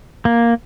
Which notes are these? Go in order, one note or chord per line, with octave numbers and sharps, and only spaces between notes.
A#3